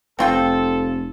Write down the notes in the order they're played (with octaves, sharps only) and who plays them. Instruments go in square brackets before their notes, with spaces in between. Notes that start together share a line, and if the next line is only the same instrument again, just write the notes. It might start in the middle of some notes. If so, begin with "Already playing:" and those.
[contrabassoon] F1 [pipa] C4 F4 G5 [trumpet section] A4